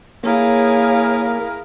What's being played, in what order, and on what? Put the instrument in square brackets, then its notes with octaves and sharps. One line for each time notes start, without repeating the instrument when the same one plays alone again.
[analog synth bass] A#3 [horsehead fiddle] E4 A#4 [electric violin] G#4 F5 [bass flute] C#5